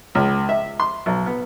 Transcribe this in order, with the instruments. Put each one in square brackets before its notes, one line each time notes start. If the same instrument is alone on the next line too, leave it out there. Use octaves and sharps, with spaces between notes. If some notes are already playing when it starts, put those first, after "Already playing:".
[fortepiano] C#2
E5
C6
B1
B3